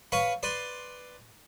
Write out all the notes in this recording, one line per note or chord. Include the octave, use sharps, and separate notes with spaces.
B4 C#5 F5 B5 C#6
B4 D5 C6